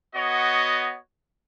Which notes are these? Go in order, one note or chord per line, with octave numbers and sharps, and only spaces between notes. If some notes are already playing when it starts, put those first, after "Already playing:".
B3 F#4 C#5 D#5